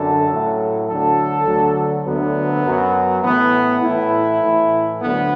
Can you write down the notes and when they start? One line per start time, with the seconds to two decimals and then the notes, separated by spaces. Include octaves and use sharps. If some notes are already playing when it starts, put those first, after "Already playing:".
Already playing: F#2 D3 A4
0.28 A2 F#3
0.87 D2 D3 F#3 A4
1.46 D2 D3 F#3
2.05 D2 D3 F#3 B3
2.65 F#2 F#3
3.23 A2 E3 B3
3.82 A2 E3 E4
4.42 A2 E3
5.01 D2 D3 F#3 B3